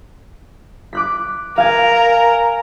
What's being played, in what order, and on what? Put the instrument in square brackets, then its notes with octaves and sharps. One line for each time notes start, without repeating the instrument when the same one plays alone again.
[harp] D6 F#6 B6
[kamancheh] A#4 [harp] F5 G#5